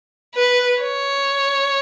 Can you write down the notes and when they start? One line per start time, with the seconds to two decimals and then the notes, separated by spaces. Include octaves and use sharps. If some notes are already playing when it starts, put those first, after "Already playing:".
0.35 B4
0.82 C#5